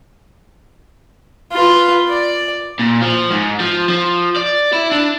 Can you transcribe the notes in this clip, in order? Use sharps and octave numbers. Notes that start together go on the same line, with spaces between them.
F4 B4
D5
A#2
F3
G#2
F3
F3
D5
E4
D4